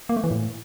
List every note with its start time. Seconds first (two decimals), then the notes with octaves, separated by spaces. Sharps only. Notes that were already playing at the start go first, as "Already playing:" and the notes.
0.09 A#3
0.17 A3
0.24 E3
0.31 A2